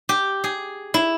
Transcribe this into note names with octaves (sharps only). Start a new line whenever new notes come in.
G4
G#4
E4